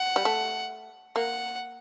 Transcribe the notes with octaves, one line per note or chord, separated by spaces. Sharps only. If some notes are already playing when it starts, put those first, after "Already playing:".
Already playing: F#5
G3
A3
A#3 F#5